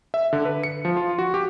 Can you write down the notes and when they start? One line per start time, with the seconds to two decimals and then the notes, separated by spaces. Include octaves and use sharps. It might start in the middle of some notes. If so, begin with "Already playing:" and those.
0.14 E5
0.33 D3
0.45 B4
0.63 C#7
0.85 F3
0.97 F4
1.19 F#4
1.34 G4